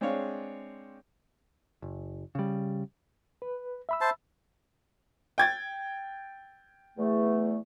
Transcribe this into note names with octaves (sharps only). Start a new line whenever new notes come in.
G#3 C4 D4 G#4 C#5 F5
F#1
C#3 G3
B4
E5 B5 E6
C5 A5
G5 G#6 A6
E2 A3